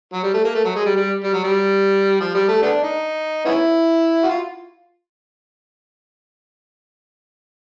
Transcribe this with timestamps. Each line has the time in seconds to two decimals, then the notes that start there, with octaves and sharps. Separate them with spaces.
0.13 F#3
0.24 G3
0.34 A3
0.45 A#3
0.55 A3
0.65 F#3
0.76 G#3
0.86 G3
0.97 G3
1.24 G3
1.34 F#3
1.44 G3
2.21 F3
2.35 G3
2.49 A3
2.62 A3 B3 D4
2.83 D#4
3.45 B3 C#4 E4
4.23 F#4
4.29 F4